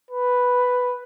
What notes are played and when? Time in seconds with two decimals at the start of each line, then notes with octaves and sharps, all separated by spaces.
0.11 B4